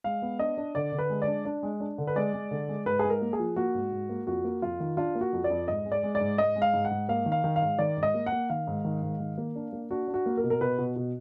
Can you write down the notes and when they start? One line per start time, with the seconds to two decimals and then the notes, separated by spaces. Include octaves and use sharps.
0.04 G#3 F5
0.22 B3
0.39 D4 D#5
0.57 D4
0.75 D3 D5
0.92 D3
0.99 B4
1.10 G#3
1.22 D5
1.27 D4
1.45 D4
1.63 G#3
1.80 D4
1.98 D3
2.07 B4
2.16 G#3 D5
2.33 G#3
2.51 D3
2.69 G#3
2.86 G#2 B4
2.99 G#2 G#4
3.10 A#4
3.22 A#3
3.33 G#4
3.39 F3
3.56 A#3 F#4
3.74 G#2
3.92 G#2
4.09 A#3
4.27 F2 F#4
4.44 A#3
4.62 F2 F4
4.80 D#3
4.97 D4 F4
5.15 A#3
5.21 F#4
5.33 F2
5.44 D5
5.50 F2
5.68 G#2 D#5
5.85 G#3
5.92 D5
6.03 G#3
6.15 D5
6.21 G#2
6.38 G#2 D#5
6.56 G#3
6.62 F5
6.73 G#2
6.85 F#5
6.91 G#2
7.09 A#3 F5
7.26 D#3
7.32 F5
7.44 D#3
7.56 F5
7.62 G#2
7.79 D#3 D5
7.97 G#2
8.03 D#5
8.14 A#3
8.26 F#5
8.32 A#3
8.50 D#3 F5
8.67 G#2
8.85 D#3
9.02 G#2
9.20 D#3
9.38 A#3
9.55 D4
9.73 A#3
9.90 D4 F#4
10.08 D4
10.14 F#4
10.26 A#3
10.37 A#4
10.44 B2
10.50 A#4
10.61 B2 B4
10.78 B2
10.96 B2